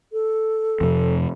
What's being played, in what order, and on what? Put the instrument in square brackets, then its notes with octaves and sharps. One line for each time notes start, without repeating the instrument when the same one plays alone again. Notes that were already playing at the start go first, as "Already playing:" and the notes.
[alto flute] A4
[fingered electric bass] F2 C3